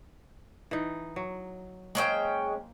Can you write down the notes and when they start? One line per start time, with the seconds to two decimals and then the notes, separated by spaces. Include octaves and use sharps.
0.71 E3 D#4
1.16 F#3
1.95 G#3 A#3 C#4 C5 G5